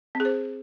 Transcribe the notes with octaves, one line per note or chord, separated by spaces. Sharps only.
C4
G#4
C5